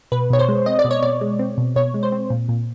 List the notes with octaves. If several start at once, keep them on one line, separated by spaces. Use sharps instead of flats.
B2 B4
B2 C#5
C5
G#3
C4 D#5
D5
B2
C#5
B2 D5
G#3
C4
B2
B2 C#5
G#3
C5
C4
A#2
A#2